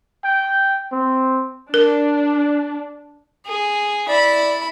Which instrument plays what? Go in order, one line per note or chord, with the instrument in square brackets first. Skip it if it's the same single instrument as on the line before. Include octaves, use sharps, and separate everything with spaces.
[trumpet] G5
C4
[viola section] D4 [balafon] A#4
[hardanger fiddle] G#4
[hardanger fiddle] E4 B5 [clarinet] D5